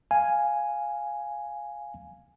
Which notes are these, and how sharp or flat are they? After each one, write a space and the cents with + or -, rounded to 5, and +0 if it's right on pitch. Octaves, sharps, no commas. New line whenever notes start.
F5 +0 G#5 +0